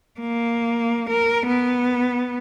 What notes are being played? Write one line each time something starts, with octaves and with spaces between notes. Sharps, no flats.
A#3
A#4
B3